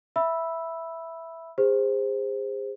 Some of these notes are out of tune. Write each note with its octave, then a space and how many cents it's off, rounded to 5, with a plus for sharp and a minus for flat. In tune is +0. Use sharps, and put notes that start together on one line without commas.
E5 +0 B5 -10 E6 +0
G#4 -35 C5 +0